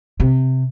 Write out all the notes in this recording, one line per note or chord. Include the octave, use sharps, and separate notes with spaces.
C3